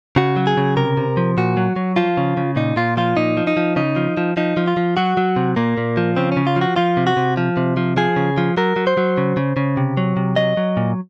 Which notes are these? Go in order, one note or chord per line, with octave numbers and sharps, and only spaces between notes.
C#3 F#4
F#3
G#4
C#3
C3 A#4
C3
F3
A#2 F#4
F#3
F#3
F3 F4
C#3
C#3
A#2 D#4
A#2 F4
F3 F4
A#2 D#4
F3
D#4
F3
C#3 D#4
F3
F3
F3 D#4
F3
F4
F3
F#3 F#4
F#3
C3
A#2 A#3
A#2
F3
C#3 C4
C#4
C#3
F4
F3
F#4
F3 F4
C3
F#4
C3
F3
C3
F3
F3 G#4
C#3
F3
F#3 A#4
F#3
C5
F#3
C#3
C#3
C#3
C3
F#3
C3
F#3 D#5
F#3
A#2